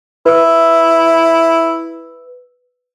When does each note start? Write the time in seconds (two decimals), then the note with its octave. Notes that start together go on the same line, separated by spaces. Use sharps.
0.26 E4 B4 E6